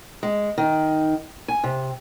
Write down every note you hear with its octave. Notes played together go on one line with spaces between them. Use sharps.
G#3
D#3
G#5
C3